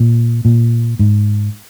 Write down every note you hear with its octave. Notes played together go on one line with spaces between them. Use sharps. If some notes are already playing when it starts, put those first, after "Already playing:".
Already playing: A#2
A#2
G#2